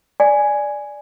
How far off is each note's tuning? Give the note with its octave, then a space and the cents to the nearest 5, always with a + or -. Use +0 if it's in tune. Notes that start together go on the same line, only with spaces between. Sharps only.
D5 +0 G#5 +0